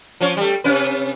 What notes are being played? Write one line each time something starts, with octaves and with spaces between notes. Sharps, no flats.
F3 C#4 C#5
G3 A3
C3 C#4 B4